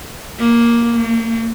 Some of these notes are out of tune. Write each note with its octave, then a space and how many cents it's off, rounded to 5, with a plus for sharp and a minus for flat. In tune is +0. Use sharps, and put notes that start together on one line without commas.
A#3 +5
A#3 -40